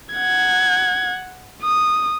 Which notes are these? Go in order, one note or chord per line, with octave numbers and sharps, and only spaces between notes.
F#5 G#6
D#6